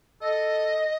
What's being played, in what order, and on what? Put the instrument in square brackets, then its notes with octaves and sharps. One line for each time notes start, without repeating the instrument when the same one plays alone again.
[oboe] A4 [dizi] D#5